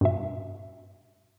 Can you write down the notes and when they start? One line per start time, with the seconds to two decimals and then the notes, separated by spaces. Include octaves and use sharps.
0.01 G2 B2 E5